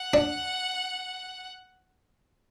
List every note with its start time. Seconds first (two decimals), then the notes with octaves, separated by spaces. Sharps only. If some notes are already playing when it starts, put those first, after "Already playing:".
Already playing: F#5
0.14 D4